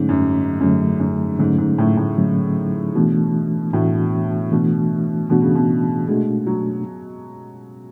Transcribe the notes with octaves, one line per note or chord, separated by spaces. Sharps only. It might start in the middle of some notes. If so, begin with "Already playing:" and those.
Already playing: G#2 D3 F#3 A3 C#4
F#2
F#2 D3 F#3 A3 C#4
F#2
G#2 D3 F#3 A3 C#4
G#2
A2
A2
D3 F#3 A3 C#4
B2 E3 A3 D4 F#4
A2 E3 A3 D4 F#4
B2 E3 A3 D4 F#4
B2 E3 A3 D4 F#4
C#3
B2
B2 G#3 A3 D4 F#4
F#3